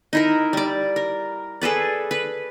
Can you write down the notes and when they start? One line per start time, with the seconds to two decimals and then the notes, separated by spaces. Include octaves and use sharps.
0.13 D#4 E4 A#4
0.53 G3 D5
0.96 A#4
1.61 G#4 A4 B4 D5
2.11 B4